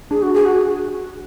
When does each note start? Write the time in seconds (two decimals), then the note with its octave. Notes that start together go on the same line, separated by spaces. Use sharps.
0.11 D4 G#4
0.22 F#4
0.34 G#4
0.45 F#4